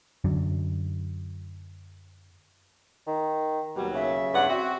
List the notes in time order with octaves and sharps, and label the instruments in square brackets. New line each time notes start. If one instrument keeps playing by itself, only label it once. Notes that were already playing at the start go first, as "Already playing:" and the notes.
[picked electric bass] F#2 D3 F#3
[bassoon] D#3
[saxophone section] D#2 B2 F#3 [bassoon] G3
[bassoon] C#3 [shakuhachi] E5
[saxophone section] E2 G2 F#5
[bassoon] C4 [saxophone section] F#4